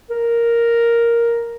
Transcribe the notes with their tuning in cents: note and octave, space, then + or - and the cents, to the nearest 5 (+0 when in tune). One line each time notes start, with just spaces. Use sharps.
A#4 +0